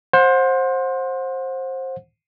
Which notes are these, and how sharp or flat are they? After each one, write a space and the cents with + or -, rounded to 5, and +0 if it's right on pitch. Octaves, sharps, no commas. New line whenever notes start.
C5 +20 F#5 -30